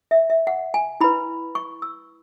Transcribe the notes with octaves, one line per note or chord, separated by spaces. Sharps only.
E5
E5
F#5
G#5
E4 B4 B5
C#6
E6